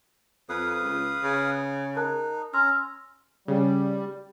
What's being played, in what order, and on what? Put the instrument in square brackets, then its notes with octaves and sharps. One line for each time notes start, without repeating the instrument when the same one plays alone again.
[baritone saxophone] F2 [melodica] B4 F5 D#6
[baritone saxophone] C#2
C#3
[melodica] D#4 [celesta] A#4 A5 F#6
[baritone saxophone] C#4 [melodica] A#5 [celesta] C6 E6 F6
[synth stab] C#3 [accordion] G3